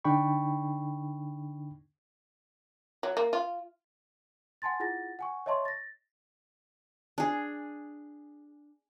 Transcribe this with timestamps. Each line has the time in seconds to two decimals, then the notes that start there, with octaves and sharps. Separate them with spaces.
0.05 D3 D4 D#4 G5 B5 C#6
3.03 F#3
3.17 A#3
3.33 F4
4.62 F#5 G#5 A5 C6 A6
4.80 E4 F4 G#4 F#5 A6 A#6
5.19 F#5 G#5 C#6
5.46 C#5 D#5 E5 A5 C6 C#6
5.65 A6 A#6
7.18 D4 G#4